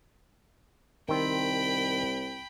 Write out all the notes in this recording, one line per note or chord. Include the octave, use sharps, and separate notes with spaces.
C2 D#3 C4 G5 B5